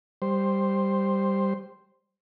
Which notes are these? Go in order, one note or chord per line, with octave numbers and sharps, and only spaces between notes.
G3 C5